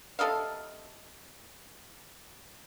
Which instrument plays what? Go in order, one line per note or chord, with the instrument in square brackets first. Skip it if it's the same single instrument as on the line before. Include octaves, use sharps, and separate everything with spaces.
[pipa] C3 A4 D#5 F5